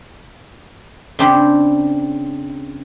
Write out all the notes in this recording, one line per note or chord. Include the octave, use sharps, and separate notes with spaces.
C#3 C4 D4 G5 B5